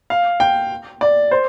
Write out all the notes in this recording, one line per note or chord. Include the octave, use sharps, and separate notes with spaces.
F5
G5
D5
C5